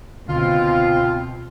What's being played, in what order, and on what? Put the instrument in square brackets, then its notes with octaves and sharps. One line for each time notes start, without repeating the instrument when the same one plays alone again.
[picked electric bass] C#2 D3 [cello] B2 [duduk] C4 [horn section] F4